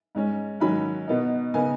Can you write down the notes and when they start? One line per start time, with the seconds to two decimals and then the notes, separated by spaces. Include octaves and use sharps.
0.15 G#2 G#3 C#4
0.60 G#2 D#3 F#3 C#4 B5
1.08 B2 B3 D#4
1.54 C#3 B3 D#4 G#5